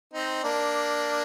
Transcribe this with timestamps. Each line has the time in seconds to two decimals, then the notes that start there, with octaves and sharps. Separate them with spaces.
0.13 C4 D#4
0.44 A#3 D4